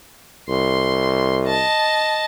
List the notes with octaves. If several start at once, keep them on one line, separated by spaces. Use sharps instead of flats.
C2 C6
D#5 A5